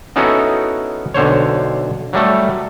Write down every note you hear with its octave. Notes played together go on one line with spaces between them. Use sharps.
B3 C#4 D#4 E4 F#4 A4
B1 D3 C5 C#5
F#3 G3 A3 A4